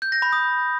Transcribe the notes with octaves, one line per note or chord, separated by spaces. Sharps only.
G6
A#6
B5
D#6